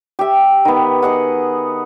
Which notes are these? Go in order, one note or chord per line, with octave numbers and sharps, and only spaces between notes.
G4 E5
D#3 B3
G#4 D#5 F#5